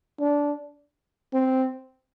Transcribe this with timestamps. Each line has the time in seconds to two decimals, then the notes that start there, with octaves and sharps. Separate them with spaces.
0.21 D4
1.34 C4